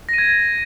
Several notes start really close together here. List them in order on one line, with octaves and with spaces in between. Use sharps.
A#6 D#7 G#6